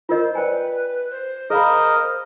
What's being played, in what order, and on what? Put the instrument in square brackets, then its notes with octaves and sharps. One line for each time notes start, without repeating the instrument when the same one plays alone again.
[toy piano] F4 A#4 D#5 [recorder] C5
[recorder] B4 [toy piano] D5 G5 G#5
[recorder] C5
[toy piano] G#4 F5 B5 [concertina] A#4 D#5